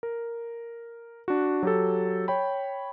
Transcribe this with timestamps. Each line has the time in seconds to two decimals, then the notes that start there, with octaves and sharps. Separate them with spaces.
0.03 A#4
1.28 D4 F#4
1.63 F#3 G4 A4
2.28 C#5 G5 B5